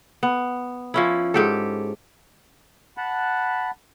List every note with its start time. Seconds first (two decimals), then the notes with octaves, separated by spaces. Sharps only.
0.23 B3
0.94 F3 C#4 E4
1.34 G#2 G4 A4
2.97 F#5 A5 B5